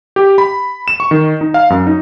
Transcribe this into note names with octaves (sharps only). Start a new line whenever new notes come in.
G4
B5
E7
C#6
D#3
D#4
F5
F#2
D#4